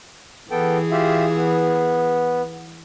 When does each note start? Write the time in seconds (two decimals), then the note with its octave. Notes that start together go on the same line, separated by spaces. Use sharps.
0.51 E3 B3 G#4 A4 G5
0.91 F4 G4 E5
1.36 B3